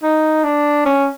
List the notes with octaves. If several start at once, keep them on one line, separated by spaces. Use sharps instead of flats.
D#4
D4
C#4